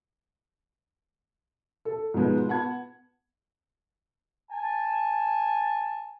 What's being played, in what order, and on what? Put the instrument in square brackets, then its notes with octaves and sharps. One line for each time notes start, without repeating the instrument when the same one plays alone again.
[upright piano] A4
G#2 B2 F3 G#3 B3 D#4
B3 B4 F#5 A5 G#6
[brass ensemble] G#5 A5